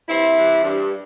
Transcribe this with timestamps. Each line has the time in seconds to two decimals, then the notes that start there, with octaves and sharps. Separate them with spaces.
0.08 G2 C4 E4
0.37 E3 G3
0.63 G2